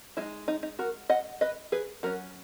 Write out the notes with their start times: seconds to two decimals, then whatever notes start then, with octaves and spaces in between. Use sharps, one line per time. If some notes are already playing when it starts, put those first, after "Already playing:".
0.17 G#3 D#4 E4
0.48 D#4
0.63 D#4
0.79 F#4 A#4
1.10 D#5 F#5
1.41 B4 D#5
1.72 G#4 B4
2.03 F#3 C#4 F#4 A#4